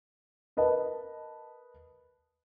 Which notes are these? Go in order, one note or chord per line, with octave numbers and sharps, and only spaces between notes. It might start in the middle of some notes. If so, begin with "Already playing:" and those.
A#4 B4 D#5 A5